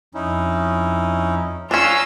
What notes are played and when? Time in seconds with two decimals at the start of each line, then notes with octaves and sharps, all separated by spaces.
0.14 F2 C#4 D#4 E4
1.71 C#4 D4 F4 C#5 A#5 D#6 E6